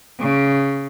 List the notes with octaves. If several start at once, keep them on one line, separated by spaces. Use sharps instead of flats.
C#3